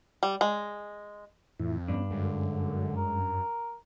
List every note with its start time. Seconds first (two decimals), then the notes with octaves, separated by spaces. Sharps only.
0.23 G3
0.41 G#3
1.60 F2 A2 E3 E4
1.88 G2 B3 C#4 D4
2.11 F#2 D3 G#3
2.97 A#4